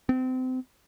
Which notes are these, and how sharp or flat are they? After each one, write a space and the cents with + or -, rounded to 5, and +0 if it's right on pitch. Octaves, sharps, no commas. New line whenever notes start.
C4 -30